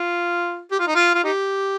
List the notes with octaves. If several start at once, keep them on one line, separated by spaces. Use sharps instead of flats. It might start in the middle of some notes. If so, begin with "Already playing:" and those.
Already playing: F4
G4
F4
D#4
F4
F4
D#4 G4